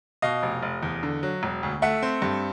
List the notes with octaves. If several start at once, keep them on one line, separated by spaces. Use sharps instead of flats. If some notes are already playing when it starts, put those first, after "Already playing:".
B2 D#5 F5
F1
F1
E2
D3
F#3
E1
D2
A3 E5 F#5
C4
G2